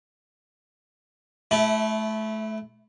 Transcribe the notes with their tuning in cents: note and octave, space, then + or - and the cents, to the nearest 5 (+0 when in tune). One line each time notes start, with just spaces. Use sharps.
A3 -25 E4 +0